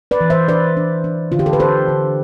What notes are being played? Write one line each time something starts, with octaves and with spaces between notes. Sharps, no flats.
B4 D5
E3
C5 E5
D4 B4 D5
D4
D4
D3 F4
G4
A4
B4
D4 A4 C5
D3